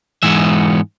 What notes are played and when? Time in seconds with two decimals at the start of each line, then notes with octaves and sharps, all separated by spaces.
0.23 G#2 E3 G#3 B3 E5